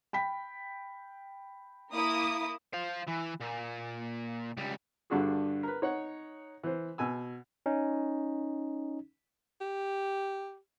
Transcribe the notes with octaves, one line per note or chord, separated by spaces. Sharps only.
G5 B5 B6
A#3 E4 D#6
C5 F5
E3
A#2
C#2 G3
G2 D3 D4 F#4 G#4
A#4 B4
D#4 C#5 F#5
E3 C5
B2 G#5 E6
C#4 D#4
G4